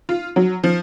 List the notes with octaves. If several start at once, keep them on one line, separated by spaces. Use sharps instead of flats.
F4
F#3
F3